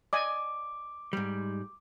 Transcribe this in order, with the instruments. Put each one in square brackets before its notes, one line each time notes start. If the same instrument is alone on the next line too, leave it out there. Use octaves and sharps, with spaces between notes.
[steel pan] D5 D#5 G#5 [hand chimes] D6
[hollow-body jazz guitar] G#2 G3